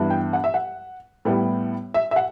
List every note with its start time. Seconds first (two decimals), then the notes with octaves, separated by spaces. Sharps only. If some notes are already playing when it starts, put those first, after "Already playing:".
Already playing: G2 E3 B3 E4
0.10 G5
0.33 F#5
0.44 E5
0.54 F#5
1.25 A2 G3 B3 E4
1.94 E5
2.11 E5
2.16 F#5